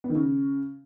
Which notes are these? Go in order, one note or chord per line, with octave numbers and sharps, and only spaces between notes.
B3
D#3
C#3